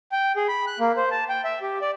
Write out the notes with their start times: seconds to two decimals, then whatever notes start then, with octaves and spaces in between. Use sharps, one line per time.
0.12 G5
0.36 G#4
0.48 B5
0.67 F#6
0.79 A#3
0.97 C5
1.11 A5
1.29 G5
1.44 E5
1.62 G4
1.82 D5